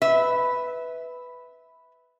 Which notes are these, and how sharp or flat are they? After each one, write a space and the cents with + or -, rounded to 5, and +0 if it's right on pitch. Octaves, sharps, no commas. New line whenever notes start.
B4 +5 E5 -20